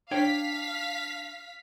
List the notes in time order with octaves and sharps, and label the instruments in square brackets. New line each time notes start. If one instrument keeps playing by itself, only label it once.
[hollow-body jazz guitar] D4 C#5 G5 [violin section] F5 B6